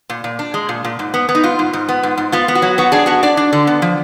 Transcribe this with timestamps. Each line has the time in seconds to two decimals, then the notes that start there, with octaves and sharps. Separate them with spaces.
0.10 A#2
0.24 A#2
0.39 D4
0.54 G#3
0.69 A#2
0.84 A#2
0.99 G#2
1.14 B3
1.29 B3
1.35 D#4
1.43 G#2 F4
1.59 G#2
1.73 G#2
1.89 B3
2.03 G#2
2.18 G#2
2.32 B3 F4
2.48 B3
2.55 F#4
2.62 F#3
2.78 B3 F#4
2.92 D4 G#4
3.06 B3 F#4
3.23 D4 D5
3.37 D4
3.53 D3
3.67 B3
3.82 F3